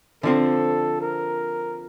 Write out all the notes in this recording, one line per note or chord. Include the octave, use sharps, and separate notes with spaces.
D3 F3 C4 A4
A#4